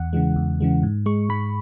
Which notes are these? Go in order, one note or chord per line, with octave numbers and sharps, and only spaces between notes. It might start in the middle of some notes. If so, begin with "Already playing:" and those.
Already playing: E2 F#5
C#3 E3 G#3
E2
C#3 E3 G#3
G#2
G#3 C#6
G#2 B5